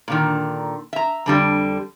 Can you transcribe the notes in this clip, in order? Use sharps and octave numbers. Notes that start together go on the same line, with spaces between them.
A#2 D3 D#3
E5 A#5
F2 D3 G3